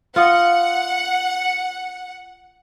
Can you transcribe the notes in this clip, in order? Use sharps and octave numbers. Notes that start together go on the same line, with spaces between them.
F4 D#5 F#5